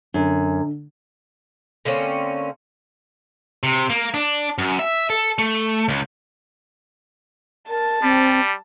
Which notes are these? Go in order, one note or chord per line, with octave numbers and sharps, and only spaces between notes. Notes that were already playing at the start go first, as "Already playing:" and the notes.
F#2 D3
D3 A#3 C4 C#4
C3
A#3
D4
F#2
E5
A4
A3
C#2
A#4 A5
G3 C4